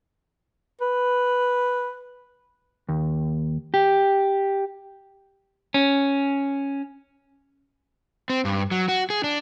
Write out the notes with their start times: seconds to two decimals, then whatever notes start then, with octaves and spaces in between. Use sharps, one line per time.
0.81 B4
2.89 D#2
3.74 G4
5.74 C#4
8.30 C4
8.45 G2
8.71 F#3
8.88 F#4
9.10 G#4
9.24 D4